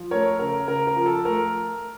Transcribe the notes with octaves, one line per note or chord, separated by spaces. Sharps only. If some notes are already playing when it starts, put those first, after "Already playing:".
Already playing: F3
A3 A#4 C#5
C#3 A#4
C#3 A#4
A#4
F3
A4
A3 A#4